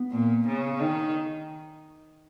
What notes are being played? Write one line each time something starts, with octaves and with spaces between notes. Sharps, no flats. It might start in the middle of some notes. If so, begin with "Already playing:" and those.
Already playing: B3
A#2
C#3
D#3